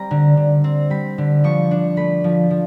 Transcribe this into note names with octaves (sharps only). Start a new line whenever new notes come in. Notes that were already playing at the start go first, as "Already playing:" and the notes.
Already playing: G3 C4 A#5
D3
D3
C4
G3 B5
D3
F3 C#6
D4
A3 B5
F3
F3